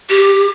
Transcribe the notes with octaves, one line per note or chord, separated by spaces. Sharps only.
G4